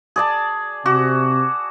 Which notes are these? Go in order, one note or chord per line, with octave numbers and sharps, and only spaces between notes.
G#4 D5 A5
C3 F#4 D6